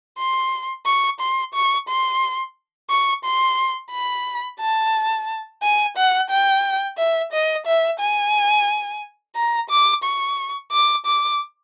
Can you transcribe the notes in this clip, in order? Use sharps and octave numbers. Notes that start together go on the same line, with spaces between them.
C6
C#6
C6
C#6
C6
C#6
C6
B5
A5
G#5
F#5
G5
E5
D#5
E5
G#5
A#5
D6
C#6
D6
D6